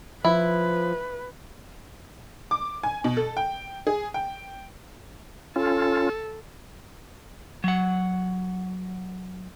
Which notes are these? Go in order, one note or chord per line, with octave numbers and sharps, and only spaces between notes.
F3 E4 B4
D6
G#5
B2
A4
G5
G#4
G5
C#4 F4 A4
F#3 F#5